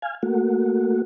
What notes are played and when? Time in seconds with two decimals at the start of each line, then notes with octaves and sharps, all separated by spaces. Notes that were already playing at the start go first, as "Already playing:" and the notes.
0.02 F5 G#5
0.23 A3 A#3 F#4